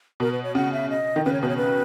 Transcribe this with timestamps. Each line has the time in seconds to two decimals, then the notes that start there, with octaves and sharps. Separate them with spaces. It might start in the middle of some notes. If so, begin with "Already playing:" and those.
0.20 B2 A#4
0.32 B4
0.43 C#5
0.55 C#3 F#5
0.73 E5
0.90 D#5
1.16 D#3
1.25 C#3 B4
1.33 C#5
1.42 B2 B4
1.48 C#5
1.57 B4